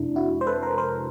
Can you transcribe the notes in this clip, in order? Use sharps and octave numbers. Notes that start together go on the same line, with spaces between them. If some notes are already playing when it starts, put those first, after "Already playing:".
Already playing: F2 C3 G#3 D4 E4
E4 F#4
C5
A4 B4
A#4 C5
A#4 C5